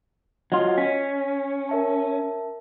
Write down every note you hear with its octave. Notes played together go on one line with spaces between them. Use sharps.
F#3 F4 D#5
C#4 B6
A#4 E5 A5